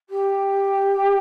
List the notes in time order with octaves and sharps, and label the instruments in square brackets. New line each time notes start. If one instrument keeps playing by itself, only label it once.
[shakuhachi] G4